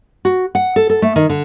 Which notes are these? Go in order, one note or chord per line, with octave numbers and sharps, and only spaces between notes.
F#4
F#5
A4
A4
A3
D#3
D3